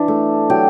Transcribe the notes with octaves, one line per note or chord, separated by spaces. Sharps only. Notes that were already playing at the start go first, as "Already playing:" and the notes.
Already playing: E3 D4
A3
F#3 G4